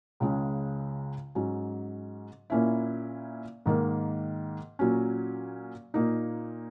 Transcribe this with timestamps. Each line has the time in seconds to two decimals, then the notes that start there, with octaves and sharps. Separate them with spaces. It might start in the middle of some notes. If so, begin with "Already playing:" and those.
0.20 C#2 C#3 G#3 C#4
1.35 G#2 F#3 C#4
2.50 A#2 A#3 C#4 E4
3.66 G#2 D#3 A#3
4.79 A#2 F#3 C#4
5.94 A#2 A#3 D#4